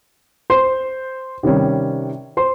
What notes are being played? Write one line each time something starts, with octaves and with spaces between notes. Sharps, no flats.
C5 C6
C3 D#3 G3 C#4
C5 C6